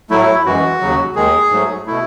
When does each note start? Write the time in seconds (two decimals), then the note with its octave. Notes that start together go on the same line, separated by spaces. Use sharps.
0.10 A2 F#3 A3 E4
0.45 F#2 E3 G#3 F#4
0.81 D#2 C#3 F#3
1.15 D#2 D#3 G#3 G#4
1.51 G#2 F#3 A3
1.86 B2 A3 E4